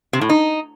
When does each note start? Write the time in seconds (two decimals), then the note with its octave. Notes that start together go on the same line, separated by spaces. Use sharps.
0.13 C3
0.21 A2
0.29 D#4